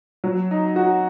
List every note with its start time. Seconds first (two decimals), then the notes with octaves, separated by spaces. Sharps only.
0.24 F#3
0.51 D#4
0.76 F#4